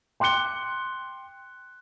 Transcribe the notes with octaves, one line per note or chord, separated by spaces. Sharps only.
G5 C6 D6 F#6 C#7 G7